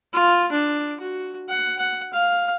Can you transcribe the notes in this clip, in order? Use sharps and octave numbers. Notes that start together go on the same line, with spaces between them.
F4
D4
F#4
F#5
F#5
F5